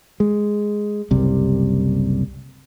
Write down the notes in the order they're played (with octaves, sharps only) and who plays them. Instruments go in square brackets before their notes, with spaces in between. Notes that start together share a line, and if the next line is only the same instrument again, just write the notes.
[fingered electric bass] G#3
F#1 C2 C3 G3